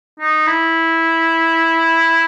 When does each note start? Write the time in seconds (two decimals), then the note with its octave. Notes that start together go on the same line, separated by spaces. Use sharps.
0.20 D#4
0.47 E4